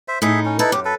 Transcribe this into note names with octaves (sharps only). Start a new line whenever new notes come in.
C5 E5
A2 D#4 G#4 E5
C#4
D#4 E4 A4 B4
F#2 G4
A4 B4